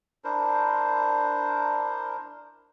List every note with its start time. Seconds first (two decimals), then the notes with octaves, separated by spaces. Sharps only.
0.24 D4 E4 A#4 C5